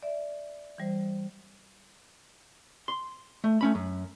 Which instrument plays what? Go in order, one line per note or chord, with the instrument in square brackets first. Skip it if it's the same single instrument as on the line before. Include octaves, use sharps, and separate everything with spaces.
[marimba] D5 E5
E3 G3 C5
[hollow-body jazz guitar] C6
A3
A3 C#4 B5
F#2